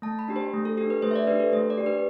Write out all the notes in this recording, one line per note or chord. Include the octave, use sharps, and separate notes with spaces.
A3 A5
B5
D4 G4
C5
A3
A4
D4 G4 A4
B4
A3 C5
E5
D5
D4 G4 B4
A4
A3 C5
D5
D4 G4
B4